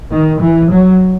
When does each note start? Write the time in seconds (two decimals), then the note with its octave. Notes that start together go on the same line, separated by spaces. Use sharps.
0.11 D#3
0.41 E3
0.71 F#3